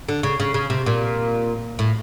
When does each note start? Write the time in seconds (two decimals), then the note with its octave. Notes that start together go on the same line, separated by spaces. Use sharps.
0.09 D3
0.23 C#3
0.40 C#3
0.54 C#3
0.70 C3
0.86 A#2
1.79 A2